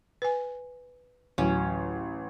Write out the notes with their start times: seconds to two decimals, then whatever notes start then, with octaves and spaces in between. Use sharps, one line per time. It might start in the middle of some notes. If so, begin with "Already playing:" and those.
0.22 B4 G#5
1.38 A1 D2 F#3 C#4